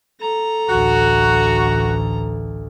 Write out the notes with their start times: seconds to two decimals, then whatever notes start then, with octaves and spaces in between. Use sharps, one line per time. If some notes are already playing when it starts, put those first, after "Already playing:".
0.20 A4 A#5
0.70 A1 D2 F#4